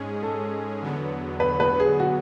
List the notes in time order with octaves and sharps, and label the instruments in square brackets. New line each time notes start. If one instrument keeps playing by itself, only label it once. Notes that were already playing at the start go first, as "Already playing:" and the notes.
Already playing: [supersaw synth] G#2 G#3 C#4 G#4
[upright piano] A4
[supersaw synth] E2 D3 F#3 B3
[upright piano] B4
B4
G#4
F#4